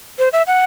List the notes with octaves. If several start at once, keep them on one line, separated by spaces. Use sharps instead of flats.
C5
E5
F#5